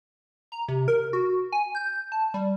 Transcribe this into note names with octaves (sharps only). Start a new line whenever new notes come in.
A#5
C3
A#4
F#4
G#5
G6
A5
G3